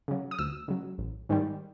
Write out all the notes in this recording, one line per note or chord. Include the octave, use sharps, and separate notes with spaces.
C#3 F#3
D#6
D2 E6
C#3 F#3
A1
G#2 D#3 G3